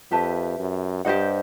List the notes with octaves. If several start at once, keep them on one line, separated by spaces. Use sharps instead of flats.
F2 G4 B4 E5 A5
F#2
G2 G4 C5 D#5 F#5